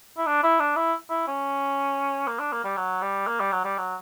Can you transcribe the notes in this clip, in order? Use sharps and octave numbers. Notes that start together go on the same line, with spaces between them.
E4
D4
E4
D4
E4
E4
C#4
A#3
D4
A#3
G3
F#3
G3
A#3
G3
F#3
G3
F#3